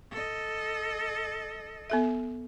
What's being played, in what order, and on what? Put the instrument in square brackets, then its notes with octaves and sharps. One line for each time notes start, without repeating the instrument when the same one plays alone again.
[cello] A4 D#5
[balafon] B3 A4 E5